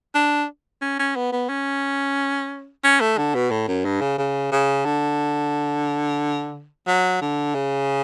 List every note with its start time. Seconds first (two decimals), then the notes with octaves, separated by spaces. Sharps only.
0.15 D4
0.81 C#4
0.99 C#4
1.16 B3
1.32 B3
1.49 C#4
2.84 C#4
3.01 A3
3.17 D3
3.35 B2
3.51 A2
3.68 F#2
3.85 G2
4.01 C#3
4.18 C#3
4.52 C#3
4.85 D3
6.87 F#3
7.21 D3
7.55 C#3